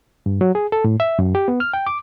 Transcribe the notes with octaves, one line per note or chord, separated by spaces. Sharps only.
G2
F#3
G#4
A4
A2
E5
F#2
G4
B3
F6
G5
D6